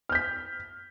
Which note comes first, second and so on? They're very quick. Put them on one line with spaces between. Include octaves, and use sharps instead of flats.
F6 G6 B6